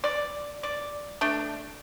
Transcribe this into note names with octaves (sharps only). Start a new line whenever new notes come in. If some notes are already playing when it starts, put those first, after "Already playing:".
D5
D5
A3 D4